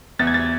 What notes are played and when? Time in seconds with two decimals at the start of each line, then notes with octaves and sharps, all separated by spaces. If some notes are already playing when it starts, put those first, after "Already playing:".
0.19 E2 A6
0.27 G#6
0.34 A6